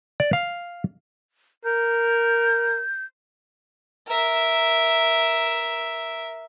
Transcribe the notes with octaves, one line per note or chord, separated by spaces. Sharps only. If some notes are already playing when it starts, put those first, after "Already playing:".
D5
F5
A#4 G6
A#4 E5